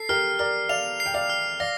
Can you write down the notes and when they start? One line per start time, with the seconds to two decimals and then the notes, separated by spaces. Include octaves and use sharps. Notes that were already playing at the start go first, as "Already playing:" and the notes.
Already playing: A4 C7
0.09 G4 A#4 F6
0.39 A#4 D5 F6
0.69 D5 F5 F7
1.00 C7
1.06 G5
1.14 D5 F5
1.30 F6
1.60 D5 F5 A#6